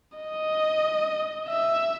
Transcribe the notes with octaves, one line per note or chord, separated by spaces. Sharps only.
D#5
E5